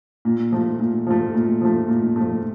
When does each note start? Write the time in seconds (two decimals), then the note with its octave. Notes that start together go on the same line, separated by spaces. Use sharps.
0.25 A#2
0.52 F3 A3
0.80 A#2
1.07 F3 A3
1.34 A#2
1.61 F3 A3
1.89 A#2
2.16 F3 A3